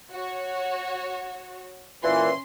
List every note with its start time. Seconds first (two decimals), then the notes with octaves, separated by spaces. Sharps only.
0.12 F#4 C#5
2.03 A#2 E3 C#4 C6